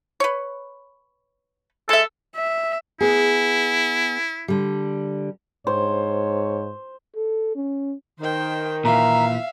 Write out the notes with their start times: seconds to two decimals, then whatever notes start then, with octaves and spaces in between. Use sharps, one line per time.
0.20 B4 C#5
1.89 G#3 A4 E5
2.36 E5
3.01 B3 E4 G#4
4.48 D3 G3
5.67 G#2 C5 C#5
7.16 A4
7.56 C#4
8.20 D#3 C5 G5
8.85 A#2 E3 E5 F5 A#5